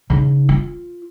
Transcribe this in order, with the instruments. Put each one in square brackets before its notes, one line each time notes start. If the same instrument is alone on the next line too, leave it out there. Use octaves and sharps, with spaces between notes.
[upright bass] C#3 D#4
F4